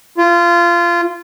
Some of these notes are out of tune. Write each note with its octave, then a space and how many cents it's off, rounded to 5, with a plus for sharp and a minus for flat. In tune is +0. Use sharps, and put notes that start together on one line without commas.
F4 -20